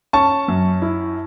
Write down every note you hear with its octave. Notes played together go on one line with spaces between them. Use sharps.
C#4 A5 C#6
F#2
E4